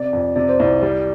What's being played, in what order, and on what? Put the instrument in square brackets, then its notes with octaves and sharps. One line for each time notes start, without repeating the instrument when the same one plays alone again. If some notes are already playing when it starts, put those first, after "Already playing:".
Already playing: [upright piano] C3 [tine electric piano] D5
[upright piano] F2
[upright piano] C3 [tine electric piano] D5
[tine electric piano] C5
[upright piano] C2 [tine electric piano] D5
[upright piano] G3 [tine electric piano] D5